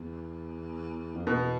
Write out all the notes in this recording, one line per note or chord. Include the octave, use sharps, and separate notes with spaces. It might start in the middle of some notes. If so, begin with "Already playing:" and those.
Already playing: E2
F2
E2 B2